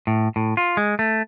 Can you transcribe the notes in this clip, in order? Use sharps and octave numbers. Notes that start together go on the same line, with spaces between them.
A2
A2
F4
G#3
A3